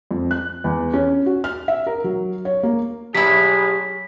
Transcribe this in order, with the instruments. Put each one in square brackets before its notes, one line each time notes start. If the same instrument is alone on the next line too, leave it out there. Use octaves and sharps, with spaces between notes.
[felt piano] F2
F#6
E2
C#4
F#4
F6
E5
A#4
F#3
C#5
A#3
[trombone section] A1 G#4 [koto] F#3 E4 [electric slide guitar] G4 D5 E5 [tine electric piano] B6